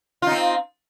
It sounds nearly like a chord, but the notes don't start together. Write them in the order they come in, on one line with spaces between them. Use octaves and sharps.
F4 D#4 C4